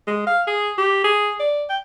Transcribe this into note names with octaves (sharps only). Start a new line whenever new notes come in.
G#3
F5
G#4
G4
G#4
D5
G5